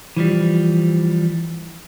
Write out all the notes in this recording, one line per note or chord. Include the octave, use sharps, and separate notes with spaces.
E3 F3 G3